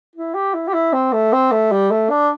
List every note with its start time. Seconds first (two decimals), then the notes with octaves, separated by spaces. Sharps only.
0.15 E4
0.34 G4
0.54 E4
0.68 G4
0.73 E4
0.93 C4
1.13 A3
1.33 C4
1.52 A3
1.72 G3
1.91 A3
2.10 D4